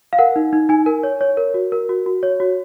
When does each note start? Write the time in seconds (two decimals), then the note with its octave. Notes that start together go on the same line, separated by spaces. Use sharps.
0.13 F5
0.18 A#4 F#5
0.36 D#4
0.53 D#4
0.69 D#4 G#5
0.86 A#4
1.03 C#5
1.21 C#5
1.37 A#4
1.54 F#4
1.72 A#4
1.89 F#4
2.06 F#4
2.23 C#5
2.40 F#4